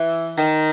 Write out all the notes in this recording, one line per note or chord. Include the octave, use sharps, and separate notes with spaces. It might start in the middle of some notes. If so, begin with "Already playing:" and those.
Already playing: E3
D#3